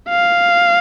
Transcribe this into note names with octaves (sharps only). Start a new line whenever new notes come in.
F5